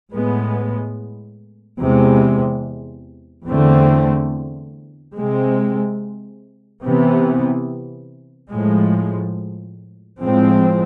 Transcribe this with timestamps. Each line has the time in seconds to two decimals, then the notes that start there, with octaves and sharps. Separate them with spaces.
0.12 A2 G#3 B3
1.81 E2 C3 G#3
3.48 E2 D3 A3 C4
5.17 C3 G#3 C4
6.85 C3 E3 B3
8.53 A2 F3 G#3
10.21 A2 F3 G#3 C4